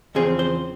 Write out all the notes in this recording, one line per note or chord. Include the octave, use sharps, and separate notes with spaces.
E2 C#3 F3 C4 G#4
C5